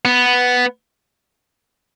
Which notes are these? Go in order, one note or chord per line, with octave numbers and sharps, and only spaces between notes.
B3